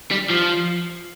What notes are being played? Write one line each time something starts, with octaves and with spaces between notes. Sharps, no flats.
G3
F3